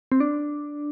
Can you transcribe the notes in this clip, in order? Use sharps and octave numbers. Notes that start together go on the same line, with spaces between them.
C4
D4